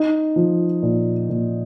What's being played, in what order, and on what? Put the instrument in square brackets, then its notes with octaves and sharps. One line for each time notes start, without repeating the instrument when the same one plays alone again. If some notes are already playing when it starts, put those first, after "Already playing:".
Already playing: [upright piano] D#4
F3
A#2
A#2